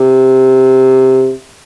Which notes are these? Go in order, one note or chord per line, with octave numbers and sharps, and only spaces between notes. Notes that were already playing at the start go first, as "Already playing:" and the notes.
Already playing: C3